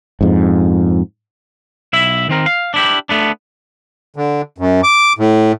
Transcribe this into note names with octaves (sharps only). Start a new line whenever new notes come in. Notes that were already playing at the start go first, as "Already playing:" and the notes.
F2 G#2
B1 E4 E5
D#3 C4 A#4
F5
D4 E4 G4
A3 B3 D4
D3
F#2
D6
A2